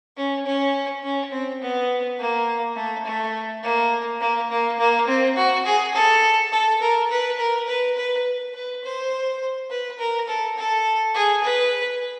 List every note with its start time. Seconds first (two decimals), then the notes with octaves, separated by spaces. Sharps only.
0.17 C#4
0.46 C#4
1.03 C#4
1.31 C4
1.61 B3
2.19 A#3
2.76 A3
3.05 A3
3.63 A#3
4.20 A#3
4.50 A#3
4.79 A#3
5.07 C4
5.36 F#4
5.66 G#4
5.94 A4
6.52 A4
6.81 A#4
7.10 B4
7.38 A#4
7.68 B4
7.97 B4
8.54 B4
8.84 C5
9.70 B4
9.99 A#4
10.28 A4
10.57 A4
11.14 G#4
11.43 B4